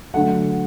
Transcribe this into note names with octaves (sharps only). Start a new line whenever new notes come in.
D3 F#3 A3 F#5